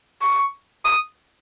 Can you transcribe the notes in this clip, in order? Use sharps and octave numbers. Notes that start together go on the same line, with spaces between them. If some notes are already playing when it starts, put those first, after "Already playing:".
C#6
D#6